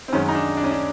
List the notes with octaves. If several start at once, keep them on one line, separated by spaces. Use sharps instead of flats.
C4
F#2 D#3 G#3 C#4
D#4
D4
D4
C#4
D4